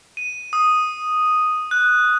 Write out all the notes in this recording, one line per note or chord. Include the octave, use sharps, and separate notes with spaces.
D#7
D#6
F#6